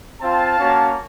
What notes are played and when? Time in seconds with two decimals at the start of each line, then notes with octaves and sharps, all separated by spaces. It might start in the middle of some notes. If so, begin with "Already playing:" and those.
0.21 C4 F4 F5 A5
0.58 A#3 C#4 F#4